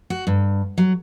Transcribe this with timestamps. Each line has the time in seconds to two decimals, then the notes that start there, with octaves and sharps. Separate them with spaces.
0.10 F#4
0.27 G2
0.78 F#3